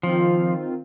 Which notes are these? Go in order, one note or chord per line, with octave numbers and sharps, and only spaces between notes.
D#3 F3 C4 F4